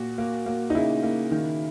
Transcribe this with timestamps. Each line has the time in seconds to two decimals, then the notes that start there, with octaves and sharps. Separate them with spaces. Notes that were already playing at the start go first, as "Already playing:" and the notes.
Already playing: A#2 F#4
0.18 A#3
0.46 A#3
0.70 D#4
0.75 C#3 E4
1.03 A#3
1.31 D#3